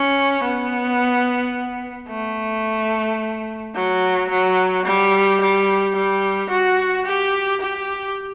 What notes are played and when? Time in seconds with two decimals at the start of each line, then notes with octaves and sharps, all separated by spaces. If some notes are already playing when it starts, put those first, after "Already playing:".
Already playing: C#4
0.44 B3
2.09 A3
3.75 F#3
4.30 F#3
4.86 G3
5.41 G3
5.96 G3
6.50 F#4
7.06 G4
7.61 G4